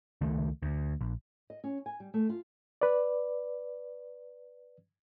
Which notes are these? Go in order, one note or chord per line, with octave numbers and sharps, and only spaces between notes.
C#2 D#3 A3
D2
A#1
D#5
C#4
G#5
G3
A3
F4
B4 D5